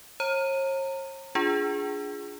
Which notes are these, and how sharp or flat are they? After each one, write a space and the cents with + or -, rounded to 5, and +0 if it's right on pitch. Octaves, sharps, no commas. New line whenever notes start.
C#5 -45 A#5 -30
D4 -15 F4 +0 G#4 +0